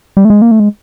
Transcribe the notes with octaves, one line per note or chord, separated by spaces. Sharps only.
G3
A3
G#3
A#3
A3
G#3